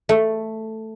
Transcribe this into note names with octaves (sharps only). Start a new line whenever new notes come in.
A3